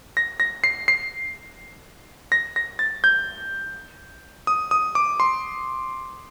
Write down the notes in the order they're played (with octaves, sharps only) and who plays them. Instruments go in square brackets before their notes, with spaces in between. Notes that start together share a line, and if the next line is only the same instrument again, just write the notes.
[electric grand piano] A#6
A#6
C7
C7
A#6
A#6
A6
G6
D#6
D#6
D6
C6